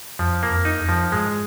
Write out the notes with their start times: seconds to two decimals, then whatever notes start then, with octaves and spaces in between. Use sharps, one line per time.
0.19 F2 F3
0.43 A#3
0.50 F2
0.65 D#4
0.81 F2
0.89 F3
1.12 G#2 G#3